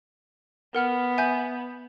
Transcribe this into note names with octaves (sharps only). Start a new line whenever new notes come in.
B3 A#4 F#5 F6
E5 G#5 G6